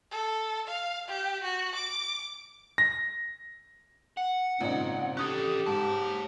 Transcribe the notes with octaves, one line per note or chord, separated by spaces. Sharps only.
A4
F5
G4
F#4
D6
A#6
F#5
G#1 A#2 C#3 C4 D#4
C#4 G4 A4 D#6 F#6
G#2 C#5 A5